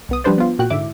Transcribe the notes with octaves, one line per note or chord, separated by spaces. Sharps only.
C2 B3 D#6
F3 G3 D4 B4 C5 D5
B3 F4
A#2 F#4 G5 F#6
G#2 D3 E4 E5 D6